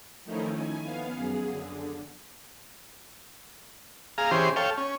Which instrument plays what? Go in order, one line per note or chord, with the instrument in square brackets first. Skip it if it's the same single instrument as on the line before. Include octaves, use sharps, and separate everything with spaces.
[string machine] D#3 F3 A3 C#4 D#4 E4
G#5
B3 F5
F#2 G#4
D3
[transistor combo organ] G#4 F5 A#5
E3 C#4 G4 G#4 C5 C6
A4 C#5 F5 G5
C#4